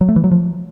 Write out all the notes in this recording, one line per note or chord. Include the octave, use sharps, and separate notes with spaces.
F#3
A3
E3
F#3
F3